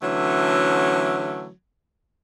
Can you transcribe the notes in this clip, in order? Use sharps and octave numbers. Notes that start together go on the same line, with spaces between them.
D3 E3 F#3 A3 C#4